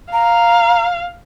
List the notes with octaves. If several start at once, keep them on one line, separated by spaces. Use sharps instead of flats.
F5 A#5